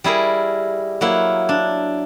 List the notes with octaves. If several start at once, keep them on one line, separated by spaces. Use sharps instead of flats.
G3 E4 G#4 A#4
F#3 A#3 E4
D4